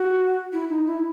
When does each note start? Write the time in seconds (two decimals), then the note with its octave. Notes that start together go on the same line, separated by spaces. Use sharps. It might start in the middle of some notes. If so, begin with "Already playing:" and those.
Already playing: F#4
0.53 E4
0.70 D#4
0.86 E4